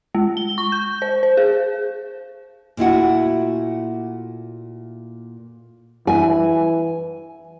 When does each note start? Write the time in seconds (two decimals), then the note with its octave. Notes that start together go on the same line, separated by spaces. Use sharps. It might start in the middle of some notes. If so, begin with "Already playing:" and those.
0.15 G#3
0.37 G7
0.58 C#6
0.72 G6
1.02 C5
1.23 C5
1.37 G#4
2.77 A#2 A3 E4 F#4
6.07 E3 G#5